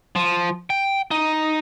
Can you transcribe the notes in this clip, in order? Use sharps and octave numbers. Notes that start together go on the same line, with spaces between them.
F3
G5
D#4